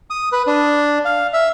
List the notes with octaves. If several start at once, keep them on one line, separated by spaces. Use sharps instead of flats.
D#6
B4
D4
F5
E5